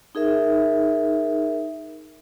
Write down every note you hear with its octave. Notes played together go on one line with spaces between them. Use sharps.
D#4 G#4 A#4 E5